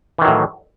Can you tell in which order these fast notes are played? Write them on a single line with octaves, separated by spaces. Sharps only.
E3 D#3 F#3 A2